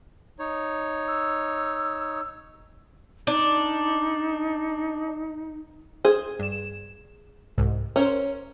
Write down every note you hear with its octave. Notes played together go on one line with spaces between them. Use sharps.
D#4 C#5
E6
D4 D#4
G#4 C5
G2 E7
C2 G#2
C#4 A#4 C5